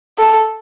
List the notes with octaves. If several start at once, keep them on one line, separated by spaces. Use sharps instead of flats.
A4